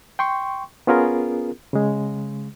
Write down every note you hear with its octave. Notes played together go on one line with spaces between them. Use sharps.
G5 C6 C#6
B3 C#4 F4 G#4 A#4
C#3 G#3